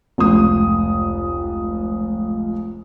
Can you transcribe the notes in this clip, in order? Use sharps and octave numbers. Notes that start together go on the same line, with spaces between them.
F1 C#2 D#6